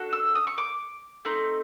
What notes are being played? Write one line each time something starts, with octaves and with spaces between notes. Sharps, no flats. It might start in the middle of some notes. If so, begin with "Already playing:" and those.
Already playing: D4 F#4 A4
E6
D#6
C#6
D6
A3 C4 D#4